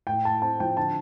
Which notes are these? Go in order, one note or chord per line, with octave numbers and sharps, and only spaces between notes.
A2 G5
A2 A5
C4 A5
F3 G5
D3 A5